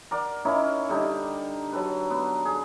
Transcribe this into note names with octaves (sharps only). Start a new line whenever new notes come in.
A#4 D5 F#5
C#4 D#4 E4 A#4
D3 G3 D#4
F#3 A4 B4
B3
G#4